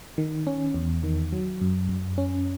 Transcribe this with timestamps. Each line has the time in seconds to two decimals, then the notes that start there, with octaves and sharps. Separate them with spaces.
0.18 D#3
0.47 C#4
0.74 E2
1.03 D#3
1.32 F#3
1.61 F#2
1.89 F#2
2.18 C#4